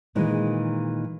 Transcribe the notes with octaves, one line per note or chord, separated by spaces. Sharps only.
A#2 D#3 E3 G#3